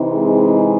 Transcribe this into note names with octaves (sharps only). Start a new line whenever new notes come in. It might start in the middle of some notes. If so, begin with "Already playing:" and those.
Already playing: C3 E3 C4 D#4
G#3 G#4